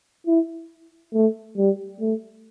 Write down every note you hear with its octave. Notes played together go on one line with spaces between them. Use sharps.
E4
A3
G3
A3